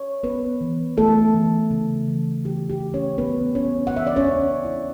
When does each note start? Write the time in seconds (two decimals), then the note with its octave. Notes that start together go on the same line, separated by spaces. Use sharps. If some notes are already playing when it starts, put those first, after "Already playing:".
Already playing: C#5
0.23 B3 C#4 B4
0.61 E3
0.97 A3 E4 A4
1.34 E3
1.71 C#3
2.08 E3
2.44 E3 G4
2.70 G4
2.82 A3
2.94 C#4 C#5
3.18 A3 B3 B4
3.55 C#3 C#4 C#5
3.87 F#5
3.92 E3 E5
4.07 D5
4.16 C#4 C#5
4.28 C#4
4.65 E4